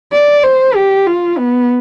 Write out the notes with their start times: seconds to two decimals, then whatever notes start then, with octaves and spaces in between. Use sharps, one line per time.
0.12 D5
0.44 C5
0.76 G4
1.07 F4
1.38 B3